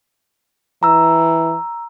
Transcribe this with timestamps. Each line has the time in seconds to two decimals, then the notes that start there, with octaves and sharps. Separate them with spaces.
0.83 E3 A#5 E6